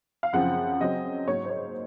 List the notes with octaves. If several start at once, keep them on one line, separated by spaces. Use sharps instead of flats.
F5
F#2 C#3 F3 C4 F#5
C#3 F#3 C4 D#5
G#2 F#3 A#3 C#4 C#5
C5
C#5